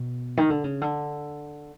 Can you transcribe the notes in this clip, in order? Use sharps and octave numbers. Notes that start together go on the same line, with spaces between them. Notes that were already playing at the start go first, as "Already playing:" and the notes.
Already playing: B2
D#3
D3
C#3
D3